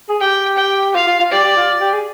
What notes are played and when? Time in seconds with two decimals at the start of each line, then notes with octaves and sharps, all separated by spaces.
0.09 G#4
0.21 G4 G5
0.57 G5
0.95 F4 F5
1.07 F4
1.20 F4
1.32 G4 D5
1.44 G4
1.57 F4
1.81 G4
1.93 G#4